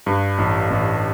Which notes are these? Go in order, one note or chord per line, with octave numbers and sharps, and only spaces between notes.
G2
A1
A1